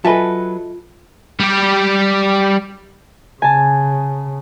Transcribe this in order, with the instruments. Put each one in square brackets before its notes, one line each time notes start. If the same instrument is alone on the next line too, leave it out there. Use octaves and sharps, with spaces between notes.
[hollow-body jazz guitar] F#3 B4 [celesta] F4 [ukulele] A4 D#5 E5 [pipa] G#5 A5
[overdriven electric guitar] G3 G4
[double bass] C#3 [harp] G#5 A5